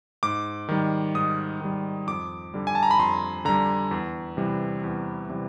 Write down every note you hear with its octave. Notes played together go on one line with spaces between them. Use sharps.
G#2 D6
D#3 G3
G#2 D#6
D#3 G3
F2 D6
D3 G3
G#5
A5
A#5
B5
F2 C6
D3 G3 A#5
E2
C3 E3 G3
E2
C3 E3 G3